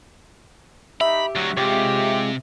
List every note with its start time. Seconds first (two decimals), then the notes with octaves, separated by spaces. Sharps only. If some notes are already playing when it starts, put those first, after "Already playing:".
1.01 D#4 G4 E5 B5
1.35 D2 F#3 F#4
1.57 C3 G#3 F4 G4 C#5